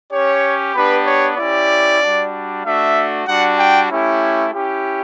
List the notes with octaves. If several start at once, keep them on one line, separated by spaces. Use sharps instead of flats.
C#4 G4 C#5
B3 D4 G4 B4
C#5
C#4 E4 G4 D5
G3 D4 F#4
A3 D4 F#4 E5
G3 D4 F#4 F#5
G5
A3 C#4 E4 G4
C#4 E4 G4